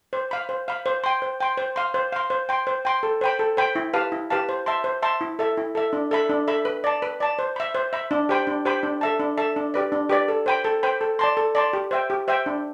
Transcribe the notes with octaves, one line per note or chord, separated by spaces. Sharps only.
C5
F5 B5
C5
F5 B5
C5
G5 C6
C5
G5 C6
C5
F5 C6
C5
F5 C6
C5
G5 C6
C5
G5 C6
A4
C5 G5 B5
A4
C5 G5 B5
E4
G4 B4 F5 A5
E4
G4 B4 F5 A5
C5
E5 A5 C6
C5
E5 A5 C6
E4
A4 E5
E4
A4 E5
D4
A4 E5 B5
D4
A4 E5 B5
B4
D5 A5
B4
D5 A5
C5
E5 B5
C5
E5 B5
D4
G4 C5 G5 B5
D4
G4 C5 G5 B5
D4
A4 E5 A5
D4
A4 E5 A5
D4
G4 B4 D5
D4
G4 B4 D5
A4
C5 G5 B5
A4
C5 G5 B5
A4
D5 A5 C6
A4
D5 A5 C6
G4
C5 E5 G5
G4
C5 E5 G5
D4